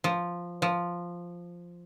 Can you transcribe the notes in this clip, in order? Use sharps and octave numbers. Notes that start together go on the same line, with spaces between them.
F3
F3